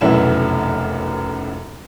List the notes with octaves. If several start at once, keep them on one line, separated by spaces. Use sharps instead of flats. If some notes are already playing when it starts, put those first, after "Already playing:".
F1 B1 F#2 E3 E4 E7